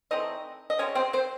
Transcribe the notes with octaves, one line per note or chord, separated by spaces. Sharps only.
E3 A3 C4 D#4 D#5
D#5
C#3 G#3 C4 C#4 C#5
C4 C5
C4 C5